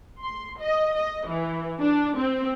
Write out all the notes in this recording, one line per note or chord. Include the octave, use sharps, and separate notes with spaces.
C6
D#5
D#5
E3
D4
C4